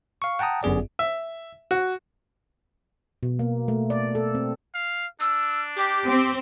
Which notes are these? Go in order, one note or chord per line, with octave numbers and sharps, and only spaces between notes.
F5 C#6
F#5 G5 A5 A#5 D#6
G1 F#2 B3 G#4 D5
E5
F#4
B2
A#3
A3
D5
A4
C4
F5
D4 E6
G4 D6
C4